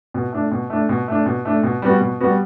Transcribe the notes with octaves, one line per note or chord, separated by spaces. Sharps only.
B2
A3 D4
B2
A3 D4
B2
A3 D4
B2
A3 D4
B2
G3 B3 F#4
B2
G3 B3 F#4